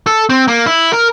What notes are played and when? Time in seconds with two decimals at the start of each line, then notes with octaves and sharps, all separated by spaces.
0.06 A4
0.30 C4
0.48 A#3
0.66 E4
0.93 A#4